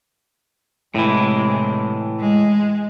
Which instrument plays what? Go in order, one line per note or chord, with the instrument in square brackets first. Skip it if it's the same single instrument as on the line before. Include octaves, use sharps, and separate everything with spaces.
[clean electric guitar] A2 E3 [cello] C3 G#3
[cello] G#3